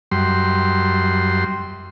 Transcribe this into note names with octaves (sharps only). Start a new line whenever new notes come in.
F#2 G3 C6